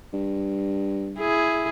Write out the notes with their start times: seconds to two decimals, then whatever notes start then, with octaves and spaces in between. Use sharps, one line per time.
0.13 G2
1.19 E4 G#4